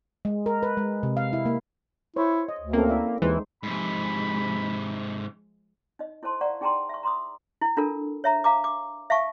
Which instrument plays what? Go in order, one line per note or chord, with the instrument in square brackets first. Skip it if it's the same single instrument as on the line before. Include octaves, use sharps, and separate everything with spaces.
[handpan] G#3
A#4
B4
G#3
C3
F5
E4
A#3
[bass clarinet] E4 [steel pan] C5 C#5
[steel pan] D#5
[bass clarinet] D2
[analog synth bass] A#3 [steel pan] C4 C#4 A4
[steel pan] E4 D5 E5
[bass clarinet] D#2 [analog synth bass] E3 [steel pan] G#3 D#4 C5
[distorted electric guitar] G#2 C3 [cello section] F3 G#3 [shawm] B5
[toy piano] D#4 D#5
E4 A4 C5 A5 C6
D5 F5 F#5 A#5 C#6
D#4 G#4 G5 A5 A#5 C6
E5 C#6
A#5 C6 D6 D#6
E4
D4 F4 A4 A#4
C#5 E5 A#5
F5 A#5 D6
D6
E5 F5 A5 C#6